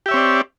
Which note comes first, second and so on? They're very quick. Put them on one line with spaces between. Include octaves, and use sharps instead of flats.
G4 E5 C#5 C4 D5